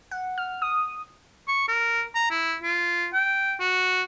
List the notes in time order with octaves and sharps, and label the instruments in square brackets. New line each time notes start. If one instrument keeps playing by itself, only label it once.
[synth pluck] F#5
F6
D#6
[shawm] C#6
A#4
A#5
E4
F4
G5
F#4